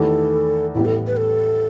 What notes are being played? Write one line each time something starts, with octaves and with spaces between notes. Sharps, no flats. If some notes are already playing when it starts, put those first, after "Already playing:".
Already playing: E2 D#3 A3 E4 G4 A4
A1 A2 G3 B3 E4
A4
B4
A4